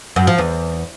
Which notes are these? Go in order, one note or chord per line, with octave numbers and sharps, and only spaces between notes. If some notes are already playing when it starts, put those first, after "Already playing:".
F#2
F3
E2